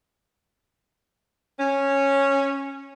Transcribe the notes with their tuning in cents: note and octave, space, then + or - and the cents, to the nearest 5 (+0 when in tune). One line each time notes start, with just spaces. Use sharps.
C#4 -10